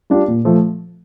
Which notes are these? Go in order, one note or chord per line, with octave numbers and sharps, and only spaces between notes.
G3 D4 F4
A#2
F3 A3